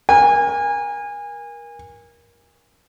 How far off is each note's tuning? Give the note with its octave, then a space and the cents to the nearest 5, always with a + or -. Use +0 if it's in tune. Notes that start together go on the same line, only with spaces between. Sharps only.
A#4 +25 G#5 -25